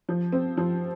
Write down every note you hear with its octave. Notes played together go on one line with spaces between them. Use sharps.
F3
C4
F3